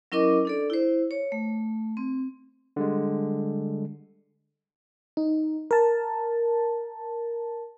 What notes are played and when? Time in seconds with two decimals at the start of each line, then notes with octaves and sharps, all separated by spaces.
0.12 F#3 C#4 E4 A#4 D#5 D6
0.45 D4 A4 D5
0.70 E4 C5
1.11 C#5
1.32 A3
1.97 C4
2.76 D3 G3 G#3
5.17 D#4
5.71 A#4 A5